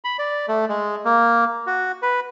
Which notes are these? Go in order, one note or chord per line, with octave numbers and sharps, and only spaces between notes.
B5
D5
A3
G#3
A#3
F#4
B4